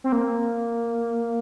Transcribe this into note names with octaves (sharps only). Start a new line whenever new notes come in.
C4
A#3